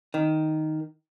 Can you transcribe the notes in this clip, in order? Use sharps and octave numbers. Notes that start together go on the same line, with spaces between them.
D#3